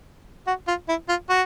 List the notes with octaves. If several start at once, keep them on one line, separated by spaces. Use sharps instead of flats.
F#4
F4
E4
F4
F#4